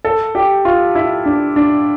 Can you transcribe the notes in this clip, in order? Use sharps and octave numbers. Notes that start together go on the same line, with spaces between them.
A4
G4
F4
E4
D4
D4